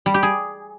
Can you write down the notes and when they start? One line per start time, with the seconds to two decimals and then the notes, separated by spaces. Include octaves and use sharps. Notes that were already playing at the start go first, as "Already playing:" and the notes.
0.06 G3
0.14 G4
0.23 G#4